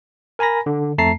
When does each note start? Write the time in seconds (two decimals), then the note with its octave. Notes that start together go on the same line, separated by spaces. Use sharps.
0.39 A#4 G#5 A#5 B5 A#6
0.66 D3
0.98 F2 A3 A5 A#5 C7